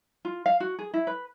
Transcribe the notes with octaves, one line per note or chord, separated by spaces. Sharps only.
F4
F5
F#4
G#4
E4
B4